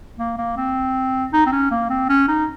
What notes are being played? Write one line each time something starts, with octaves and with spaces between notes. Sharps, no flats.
A#3
A#3
C4
D#4
C4
C#4
A#3
C4
C#4
D#4